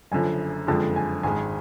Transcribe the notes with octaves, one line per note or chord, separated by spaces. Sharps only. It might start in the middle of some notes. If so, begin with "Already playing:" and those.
F#1 F#2 D3 F3 G#5
F#1 F2 D3 F3 G#3 A5
G#5
G#1 G#2 G#3 G#5